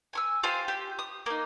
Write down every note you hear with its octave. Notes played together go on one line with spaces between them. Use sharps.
G#5 C#6 E6
F4 G4 C5 G#5
G4
D#6
A#3 D#4